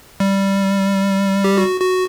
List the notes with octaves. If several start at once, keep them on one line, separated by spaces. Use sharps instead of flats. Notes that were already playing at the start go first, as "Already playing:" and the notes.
G3
G4
F#4
F#4